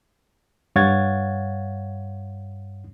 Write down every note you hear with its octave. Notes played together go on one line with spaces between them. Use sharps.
G2 C#5 F5 F#5 G#6 A6